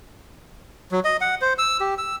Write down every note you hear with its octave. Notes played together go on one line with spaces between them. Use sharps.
F#3
D#5
F#5
C5
E6
G4
E6